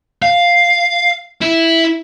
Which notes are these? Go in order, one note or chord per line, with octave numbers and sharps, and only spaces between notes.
F5
E4